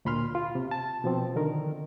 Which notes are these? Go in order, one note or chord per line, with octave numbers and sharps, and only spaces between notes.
D2 A#2 B5 C6 F6
F4
C3
A5
B2 F3 C4
D3 D#3 A#4